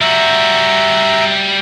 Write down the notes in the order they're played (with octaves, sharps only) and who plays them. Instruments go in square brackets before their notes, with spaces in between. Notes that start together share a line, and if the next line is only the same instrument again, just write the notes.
[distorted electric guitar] G3 F#4 [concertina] E5 A#5